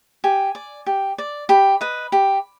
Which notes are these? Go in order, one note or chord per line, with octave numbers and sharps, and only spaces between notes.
G4 G#5
D5
G4
D5
G4 B5
B4 D#5
G4